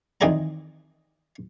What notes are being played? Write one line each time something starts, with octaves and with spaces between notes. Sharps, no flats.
F2 D#3 E3 G#4 D5 A#5